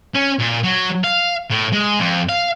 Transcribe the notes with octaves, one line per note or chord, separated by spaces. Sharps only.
C#4
A#2
F#3
F5
A2
G#3
F2
F5